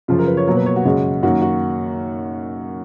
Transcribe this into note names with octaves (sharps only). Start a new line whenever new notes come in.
F#2 C#3 F3 F4
A#4
B4
C#5
B2 F#3 A#3 C#5
B4
C#5
F#4
F#2 C#3 G#3
F#2 D#3 A#3 F#4
F#4